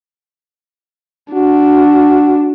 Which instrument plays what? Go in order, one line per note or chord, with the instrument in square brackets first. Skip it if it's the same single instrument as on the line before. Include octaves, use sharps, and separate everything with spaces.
[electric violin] D4 [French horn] F#4